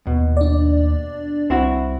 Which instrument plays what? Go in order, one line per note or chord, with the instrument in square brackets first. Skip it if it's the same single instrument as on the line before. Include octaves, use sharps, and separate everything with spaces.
[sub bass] D#2 [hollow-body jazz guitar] B2
[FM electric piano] D4 D5
[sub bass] C2 [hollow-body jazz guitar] C4 E4 F#4